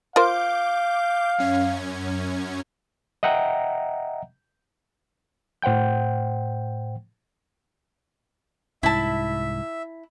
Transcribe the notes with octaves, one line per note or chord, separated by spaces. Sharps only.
F4 A#4 C5 F5 D6 G6
F#2 C#4 G#6
D#5 E5 F#5 G5 A#5
A2 C5 F#5 G5 G6
C2 G#2 E4 E5 A5